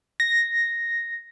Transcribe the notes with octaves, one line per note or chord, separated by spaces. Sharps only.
A#6